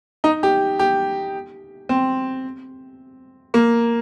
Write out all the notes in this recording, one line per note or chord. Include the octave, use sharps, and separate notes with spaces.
D#4
G4
G4
C4
A#3